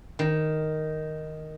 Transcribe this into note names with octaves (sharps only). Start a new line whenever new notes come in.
D#3